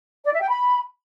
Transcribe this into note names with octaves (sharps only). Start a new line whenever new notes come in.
D5
E5
G5
B5